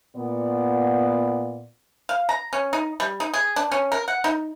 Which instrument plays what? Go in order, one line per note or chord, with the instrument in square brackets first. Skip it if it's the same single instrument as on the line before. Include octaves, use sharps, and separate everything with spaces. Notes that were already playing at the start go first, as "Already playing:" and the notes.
[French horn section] A#2 B3 D5
[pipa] F5
A#5
C#4
D#4
G3
D#4
G#4
D4
C#4
A#4
F#5
D#4